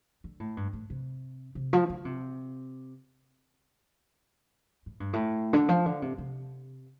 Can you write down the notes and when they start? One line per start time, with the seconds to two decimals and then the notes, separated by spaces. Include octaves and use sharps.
0.24 D3
0.40 A2
0.57 G2
0.73 A2
0.90 C3
1.55 C3
1.73 F3
1.90 D3
2.05 C3
4.86 A2
5.00 G2
5.13 A2
5.53 D3
5.69 F3
5.86 D3
6.02 C3
6.18 C3